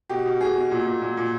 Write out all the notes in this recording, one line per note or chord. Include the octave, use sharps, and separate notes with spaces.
B2 G4
B2
B2 G#4
B2
A#2
A#2
A#2
A#2